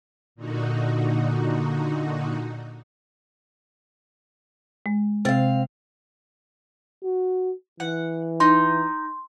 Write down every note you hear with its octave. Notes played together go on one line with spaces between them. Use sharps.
A#2 D3 D#4 F#4
G#3
C3 C4 F5 A6
F#4
E3 F#5
D#4 C6